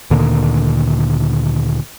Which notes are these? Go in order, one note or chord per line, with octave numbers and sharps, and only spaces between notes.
D2 A#2 D3 D#3